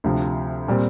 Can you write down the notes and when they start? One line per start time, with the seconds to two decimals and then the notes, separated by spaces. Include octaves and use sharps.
0.04 D2 C3 F3
0.68 A#2 G3 C4